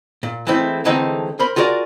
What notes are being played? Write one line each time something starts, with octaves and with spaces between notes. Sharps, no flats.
A#2
E3 G#3 A3 C4 E4
D3 E3 G#3 A3 C4 D#4
A#4 C5 B5
F4 F#4 G#4 A#4 D5